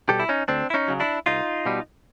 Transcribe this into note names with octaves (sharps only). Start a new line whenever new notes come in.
B2 G3 G4 A4
E4
C#4 D#4
D2 C4 D4
E4
C#4 D#4
C#3 F#3
D4 E4
C2 D#4 F4
B2 G3